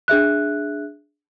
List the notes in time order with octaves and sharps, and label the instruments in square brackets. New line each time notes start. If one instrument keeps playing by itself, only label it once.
[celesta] D4 G#4 E5 F#6